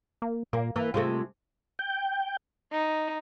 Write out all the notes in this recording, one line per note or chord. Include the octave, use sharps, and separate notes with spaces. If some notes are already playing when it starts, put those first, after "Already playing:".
A#3
A#2 A#3
E3 A#3
C3 G#3 A3 F4
G5
D#4